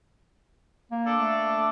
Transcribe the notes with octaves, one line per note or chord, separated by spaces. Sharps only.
A#3
D4 A4 D5
A3